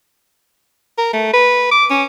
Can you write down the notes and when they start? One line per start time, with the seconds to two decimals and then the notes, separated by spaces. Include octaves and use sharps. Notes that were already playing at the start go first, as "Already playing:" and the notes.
0.98 A#4
1.13 A3
1.34 B4
1.71 D6
1.91 C#4